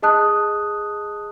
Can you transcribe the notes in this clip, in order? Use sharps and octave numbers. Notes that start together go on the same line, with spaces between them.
G#4 D#5 A5 D#6 F#6